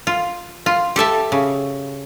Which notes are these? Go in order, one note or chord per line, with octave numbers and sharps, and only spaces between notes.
F4
F4
G4 A4 E5 A5
C#3